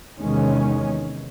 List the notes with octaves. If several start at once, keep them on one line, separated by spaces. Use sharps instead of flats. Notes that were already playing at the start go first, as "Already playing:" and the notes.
E2 C3 D#3 G#3 C#4